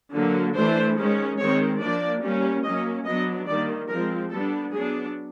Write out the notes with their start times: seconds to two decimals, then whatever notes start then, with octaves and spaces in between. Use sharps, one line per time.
0.13 D3 F#3 A#3
0.55 E3 A3 D4 C5
0.96 D#3 G#3 C#4
1.38 D#3 G#3 C4 C#5
1.80 F3 A#3 D4 D5
2.21 G3 A#3 C#4
2.63 F#3 A#3 C#4 D#5
3.05 F#3 B3 D4 D#5
3.47 D#3 G3 A#3 D5
3.88 F3 G#3 C4 A#4
4.30 G3 B3 D4 A4
4.72 F#3 B3 D4 G#4